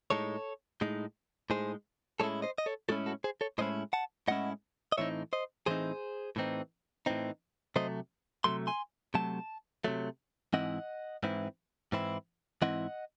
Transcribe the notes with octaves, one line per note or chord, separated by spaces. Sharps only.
A2 G#3 D#4 A4 C#5
A2 G#3 D#4
A2 G#3 D#4 G#4 C5
A2 G#3 C#4 E4 A4 C#5
C5 D#5
D#5
A4 C#5
A2 G#3 C#4 E4 F#4 A4
F#4 A4
G#4 C5
A4 C#5
A2 G#3 C#4 E4 C5 D#5
F#5 A5
A2 G#3 C#4 E4 D#5 F#5
D#5
A2 E3 C4 D#4 C#5 E5
C5 D#5
A2 E3 C4 D#4 G#4 C5
A2 E3 C4 D#4
A2 E3 C4 D#4
C3 F#3 A3 C5 D#5
C3 F#3 A3 C6
G#5 C6
C3 F#3 A3 A5
C3 F#3 A3
G#2 E3 C4 E4 D#5 F#5
G#2 E3 C4 E4
G#2 E3 C4 E4
G#2 E3 C4 E4 D#5 F#5